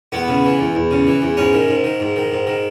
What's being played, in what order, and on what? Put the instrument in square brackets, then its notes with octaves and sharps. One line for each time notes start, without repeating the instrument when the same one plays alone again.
[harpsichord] E2 B3
C#3
E3
E2
E2
C#3
E3
E2
G#2 C#4
D#3
G#2
D#3
G#2
D#3
G#2
D#3